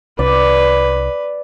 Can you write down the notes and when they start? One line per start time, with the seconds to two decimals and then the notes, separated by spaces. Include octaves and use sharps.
0.19 C2 B4 D5